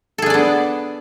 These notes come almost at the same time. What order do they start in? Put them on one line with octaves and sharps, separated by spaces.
A4 G#4 D4 D5 B3